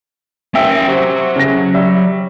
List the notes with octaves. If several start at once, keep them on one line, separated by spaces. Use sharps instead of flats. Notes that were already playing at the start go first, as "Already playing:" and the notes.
D#2 C#4 E5 G5
C3 F#3
C#3 A#6
G3 E5